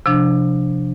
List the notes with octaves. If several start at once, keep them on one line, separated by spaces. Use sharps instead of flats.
C3 F3 D4